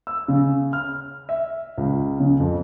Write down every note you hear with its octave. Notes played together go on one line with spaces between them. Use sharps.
E6
C#3
F6
E5
C#2
C#3
F2